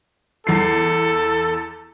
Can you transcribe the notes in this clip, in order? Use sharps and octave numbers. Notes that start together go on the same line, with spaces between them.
E2 A4 C7